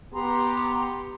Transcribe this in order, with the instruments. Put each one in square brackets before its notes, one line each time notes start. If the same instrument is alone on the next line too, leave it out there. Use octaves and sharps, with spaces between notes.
[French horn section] B3 G4 [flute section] A#5 C6